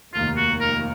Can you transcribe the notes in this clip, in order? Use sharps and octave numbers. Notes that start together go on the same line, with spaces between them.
F1 D#2 D#3 A#3 F4
F#4
A#4